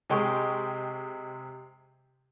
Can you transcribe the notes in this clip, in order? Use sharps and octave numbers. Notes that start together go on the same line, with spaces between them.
C3 G#3 G5 C#6